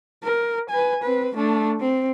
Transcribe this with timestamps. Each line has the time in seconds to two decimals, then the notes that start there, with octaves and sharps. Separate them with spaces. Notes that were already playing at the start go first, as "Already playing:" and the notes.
0.23 A#4
0.70 B4 G#5
1.02 C4 B4
1.35 A3 D4
1.80 C4